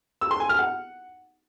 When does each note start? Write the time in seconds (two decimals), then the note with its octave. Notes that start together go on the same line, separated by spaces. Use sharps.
0.21 E6
0.31 C6
0.40 G#5
0.49 F6
0.59 F#5